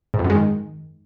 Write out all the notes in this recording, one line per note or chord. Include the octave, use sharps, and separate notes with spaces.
G#2
F2
F#2
G#3
D#3